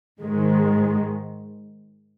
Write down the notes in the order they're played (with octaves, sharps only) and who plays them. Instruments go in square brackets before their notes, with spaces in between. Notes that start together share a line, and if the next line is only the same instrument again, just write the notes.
[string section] G#2 D#3 G#3